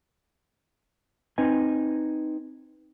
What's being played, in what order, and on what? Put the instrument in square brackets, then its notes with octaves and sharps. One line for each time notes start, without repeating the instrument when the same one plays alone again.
[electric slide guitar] C4 D#4 B4 D#5 G#5